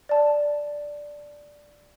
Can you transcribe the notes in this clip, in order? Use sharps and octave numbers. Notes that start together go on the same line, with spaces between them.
D5 A5